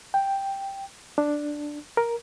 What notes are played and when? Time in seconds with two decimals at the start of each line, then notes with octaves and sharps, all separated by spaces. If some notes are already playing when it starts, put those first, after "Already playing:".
0.14 G5
1.18 D4
1.97 A#4